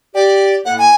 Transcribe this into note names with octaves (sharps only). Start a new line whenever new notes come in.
G4 D5
A2 A#3 F#5
G#5